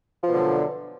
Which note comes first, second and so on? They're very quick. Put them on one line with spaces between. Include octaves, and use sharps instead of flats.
F3 B2 D3 F#2